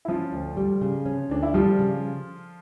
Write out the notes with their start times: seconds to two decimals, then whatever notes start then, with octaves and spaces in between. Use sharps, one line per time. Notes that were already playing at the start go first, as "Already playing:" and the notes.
0.05 E4
0.08 F3 C#4 F4
0.33 D2
0.57 G3
0.81 C#3
1.06 C#4
1.30 D2 D4
1.43 E4
1.54 F3 G3 F4
1.79 C#3